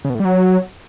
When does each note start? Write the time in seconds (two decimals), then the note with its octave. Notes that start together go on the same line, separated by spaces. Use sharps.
0.05 C#3
0.10 B2
0.15 A2
0.20 G3
0.25 F#3